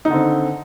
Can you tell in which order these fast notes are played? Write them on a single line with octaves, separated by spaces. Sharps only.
D#4 D#3 D3 C4